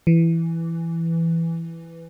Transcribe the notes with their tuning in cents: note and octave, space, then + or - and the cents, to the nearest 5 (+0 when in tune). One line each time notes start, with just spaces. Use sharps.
E3 +10